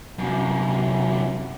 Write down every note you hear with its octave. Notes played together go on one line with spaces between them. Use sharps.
F#2 C3